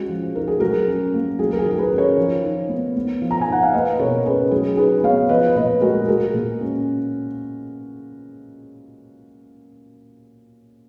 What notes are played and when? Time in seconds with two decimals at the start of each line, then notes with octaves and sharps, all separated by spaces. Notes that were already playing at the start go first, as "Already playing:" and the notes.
Already playing: G#3 C#4 F#4
0.09 F3
0.35 D#4 A#4
0.47 G#4
0.60 F#3 F#4 A#4
0.88 C#4
1.14 A#3
1.39 F#3 G#4
1.52 A#4
1.59 G#4
1.65 D#3
1.71 A#4
1.78 G#4 B4
1.91 C#4
1.98 A#4 C#5
2.18 F3
2.44 D#4
2.69 B3
2.96 B3
3.22 F3
3.31 A#5
3.41 G#5
3.48 D#4 F#5
3.63 F5
3.73 A#3 B4 D#5
3.99 B2 A#4 C#5
4.26 C#4 G#4 B4
4.51 F#3 G#4
4.77 D#4 G#4 B4
5.03 B3 C#5 F5
5.29 F3 B4 D#5
5.56 A#2 B4 D#5
5.81 G#3 F#4 A#4
6.08 G#3 F#4 A#4
6.34 A#2
6.60 C#4